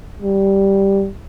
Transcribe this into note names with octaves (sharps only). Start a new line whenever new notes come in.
G3